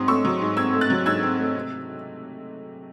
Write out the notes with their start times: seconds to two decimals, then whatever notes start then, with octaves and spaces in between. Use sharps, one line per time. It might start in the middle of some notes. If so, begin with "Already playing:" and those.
Already playing: G#2 F#3 C4 C6 D#6
0.08 A3 C#6 E6
0.25 F#3
0.41 G#2
0.57 C4 E6 G#6
0.73 A3
0.81 F#6 A6
0.90 F#3
1.06 G#2 E6 G#6
1.23 C4
1.39 A3
1.55 C3